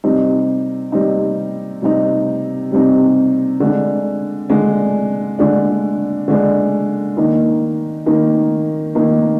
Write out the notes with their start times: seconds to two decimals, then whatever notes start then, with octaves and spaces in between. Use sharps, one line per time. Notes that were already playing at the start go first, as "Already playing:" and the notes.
0.04 C3 G3 C4 D#4
0.92 C3 G3 C4 D#4
1.82 C3 G3 C4 D#4
2.71 C3 G3 C4 D#4
3.60 D3 G#3 D4
4.50 D3 G#3 D4
5.39 D3 G#3 D4
6.28 D3 G#3 D4
7.17 D#3 A#3 D#4
8.06 D#3 A#3 D#4
8.95 D#3 A#3 D#4